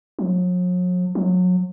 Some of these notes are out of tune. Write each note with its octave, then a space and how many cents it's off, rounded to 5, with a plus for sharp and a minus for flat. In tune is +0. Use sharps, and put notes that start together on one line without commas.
F#3 -45
F#3 -30